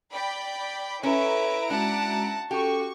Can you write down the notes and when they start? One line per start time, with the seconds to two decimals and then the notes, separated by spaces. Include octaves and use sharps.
0.13 D5 G5 B5
1.03 C#4 E4 A4 B4 E5 A#5 D7
1.70 G#3 C#4 D4 F#4 F#5 A5
2.51 C#4 F#4 G4 A4 C#6